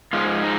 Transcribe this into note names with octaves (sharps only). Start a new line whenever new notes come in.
G#2 F3 G#3 F4
D#4